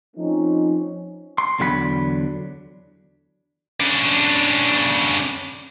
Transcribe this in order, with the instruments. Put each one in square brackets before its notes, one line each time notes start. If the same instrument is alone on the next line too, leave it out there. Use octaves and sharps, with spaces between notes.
[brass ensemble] F3 A3 C4 C#4 D#4
[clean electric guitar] C6
E2 D3 F#3 F5 B5
[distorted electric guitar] C#3 D4